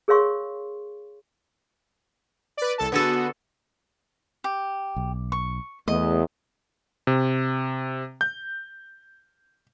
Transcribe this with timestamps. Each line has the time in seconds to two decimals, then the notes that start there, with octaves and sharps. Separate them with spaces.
0.08 G#4 A#4 C#5 F5 C6 C#6
2.57 B4 D5
2.78 C2 A4 A5
2.92 D3 B3 F#4 G#4 A4
4.44 G4
4.96 B1
5.32 C#6
5.88 E2 A3 D#5
7.07 C3
8.21 G6